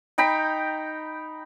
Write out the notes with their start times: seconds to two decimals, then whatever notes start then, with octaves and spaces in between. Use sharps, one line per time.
0.18 D#4 G5 A#5 B5